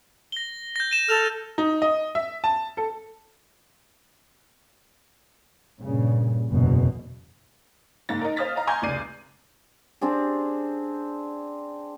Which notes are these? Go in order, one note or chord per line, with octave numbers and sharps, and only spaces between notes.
A#6 G7
G6 A#6
D#7 E7
A4 F6 F7
D#4
D#5
E5
A5
A4
G2 A#2 C#3
F#1 E2 B2
F#1 G#2 F5 A6
D#4 A#4
C5 F5 D#6 F6 A6 B6
D#5 F5 A#5
G#5 A#5 C6 C#6 G6 G#6
F1 C#2 D5 C7 D#7
C4 D4 G#4